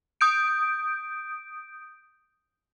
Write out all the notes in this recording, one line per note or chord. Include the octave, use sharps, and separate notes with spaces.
D#6 G6 D7